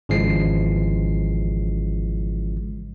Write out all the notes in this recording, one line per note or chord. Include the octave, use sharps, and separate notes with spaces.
G#1 C#3 E3 F3 G#3 C7